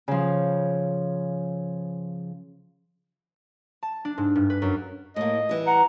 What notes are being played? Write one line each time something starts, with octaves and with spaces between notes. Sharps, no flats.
C#3 F3
A5
D4
G#2
G2
B4
F#2
A2 A#3 D#5
E3 G3
F#5 A#5